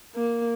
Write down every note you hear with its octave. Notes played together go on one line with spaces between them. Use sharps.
A#3